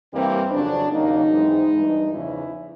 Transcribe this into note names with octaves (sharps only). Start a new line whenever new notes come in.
G2 E3 G3 A#3 C4
F2 C#3 F#3 D4
D#2 C#3 F#3 A#3 D#4
G#2 E3 G#3 C4
G2 E3 G#3
E2 C#3 F3 E4